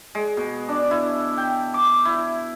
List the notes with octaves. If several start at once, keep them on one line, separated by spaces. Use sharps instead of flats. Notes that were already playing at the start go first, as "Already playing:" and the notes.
G#3
B2
D4
E4
G5
D6
E4